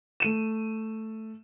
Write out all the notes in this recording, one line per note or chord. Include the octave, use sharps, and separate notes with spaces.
A3 D#7 E7